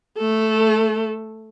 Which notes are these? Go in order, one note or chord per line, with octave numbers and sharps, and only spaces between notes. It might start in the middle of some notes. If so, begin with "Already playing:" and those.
A3 A4